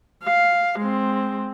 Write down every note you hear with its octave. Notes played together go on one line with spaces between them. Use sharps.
F5
G#3 C4